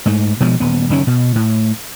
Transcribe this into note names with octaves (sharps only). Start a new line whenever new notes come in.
G#2 A3
B2 F3 G3 G#3
D#1 B3
F#1 D#3 C#4
B2
A2